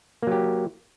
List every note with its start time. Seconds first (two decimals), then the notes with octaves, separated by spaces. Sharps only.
0.23 A#3
0.27 F#3
0.32 G4